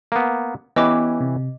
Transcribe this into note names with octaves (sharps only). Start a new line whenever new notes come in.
A#3 B3
E3 B3 C#4 G4 B4 D#5 D6
C3